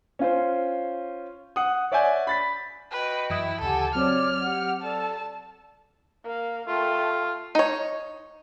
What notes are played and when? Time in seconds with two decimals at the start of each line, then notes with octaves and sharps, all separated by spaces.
0.19 C#4 F4 C5
1.56 F#5 D#6
1.92 C#5 D5 E5 F#5 G#5 G6
2.27 B5 A6 B6
2.92 F#4 B4 D#5 G5
3.30 F#2 E3 E4 D#6
3.61 D2 C#3 G4 A4 F#5 G#5
3.95 F#3 C4 C#5 D5 D6 F6
4.41 G4 F#5
4.82 A4 D5 A5
6.24 A#3 F5
6.68 A3 F4 G5
7.55 D#4 C#5